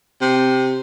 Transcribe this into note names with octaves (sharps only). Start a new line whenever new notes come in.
C3